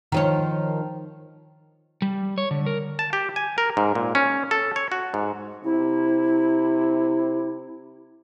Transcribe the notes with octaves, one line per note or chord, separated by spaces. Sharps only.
D#3 F3 C#5
G3
C#5
D3
A#4
A5
G4
G#5
A#4
G#2
A#2
C#4
A4
C#5
F#4
G#2
C3 E4